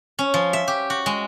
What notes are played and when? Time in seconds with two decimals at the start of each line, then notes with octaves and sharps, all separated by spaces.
0.19 C#4
0.34 F3
0.53 E5
0.68 G4
0.90 F#4
1.06 G#3